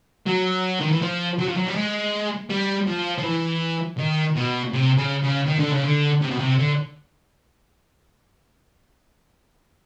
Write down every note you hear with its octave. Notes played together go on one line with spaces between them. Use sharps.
F#3
D#3
E3
F3
F#3
F3
F#3
G3
G#3
G3
F3
F3
E3
D#3
B2
C3
C#3
C#3
D#3
D3
C#3
D3
C3
B2
C3
D3